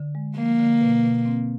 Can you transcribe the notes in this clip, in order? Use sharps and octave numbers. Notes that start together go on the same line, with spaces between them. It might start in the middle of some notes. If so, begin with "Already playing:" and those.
Already playing: D3
G#3
F3 A#3
D3
B2
B2
C4